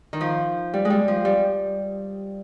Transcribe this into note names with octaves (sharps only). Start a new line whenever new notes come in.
D#3
F3
G3
G#3
G3
F3
G3